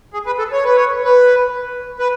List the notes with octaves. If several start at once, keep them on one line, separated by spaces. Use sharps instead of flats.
G#4
B4
A4
C#5
B4
C#5
B4
B4